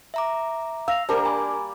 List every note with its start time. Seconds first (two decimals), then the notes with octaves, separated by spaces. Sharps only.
0.14 E5 A#5 D6
0.88 F5 E6 A#6 F7
1.09 G3 A#3 D4 A#4 C5 A5
1.25 G#5 A#5 B5 D6